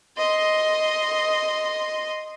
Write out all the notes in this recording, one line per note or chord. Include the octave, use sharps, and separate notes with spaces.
D#5 C6